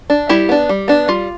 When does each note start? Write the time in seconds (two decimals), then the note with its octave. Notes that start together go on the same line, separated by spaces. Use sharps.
0.10 D4
0.29 G3 E4 G4
0.49 B3 D4
0.69 G3
0.88 B3 D4
1.08 G3 F4